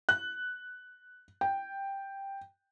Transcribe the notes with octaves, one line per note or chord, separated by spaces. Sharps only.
F#6
G5